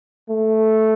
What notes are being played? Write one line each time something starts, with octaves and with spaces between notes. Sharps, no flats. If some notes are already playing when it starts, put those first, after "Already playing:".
A3